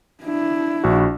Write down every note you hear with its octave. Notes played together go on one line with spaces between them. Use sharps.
D4 E4
A#1 F#4